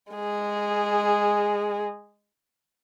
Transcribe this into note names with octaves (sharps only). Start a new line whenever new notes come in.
G#3 G#4